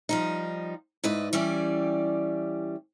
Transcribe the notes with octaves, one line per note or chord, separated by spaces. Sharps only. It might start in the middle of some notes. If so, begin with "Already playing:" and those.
F3 G3 D#4
G#2 E4 B4 D5 D#5
E3 G3 C#4 G4 D5